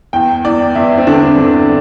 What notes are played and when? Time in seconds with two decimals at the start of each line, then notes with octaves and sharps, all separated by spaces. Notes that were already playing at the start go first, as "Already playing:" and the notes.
0.13 E2 G5
0.45 E2 D5
0.75 E2 E4
0.98 C4
1.07 D3 D4
1.39 D3